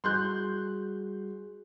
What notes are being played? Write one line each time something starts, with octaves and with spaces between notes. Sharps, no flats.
G3 F#4 G#4 C6 F#6 G6